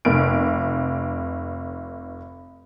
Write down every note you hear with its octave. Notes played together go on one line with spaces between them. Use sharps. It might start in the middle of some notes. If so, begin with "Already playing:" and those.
F1 D7